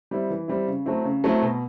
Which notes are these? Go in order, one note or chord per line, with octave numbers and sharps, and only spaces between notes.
G3 C4 E4
E3
G3 C4 E4
C#3
F#3 A3 C4 E4
C#3
F#3 A3 C4 E4
B2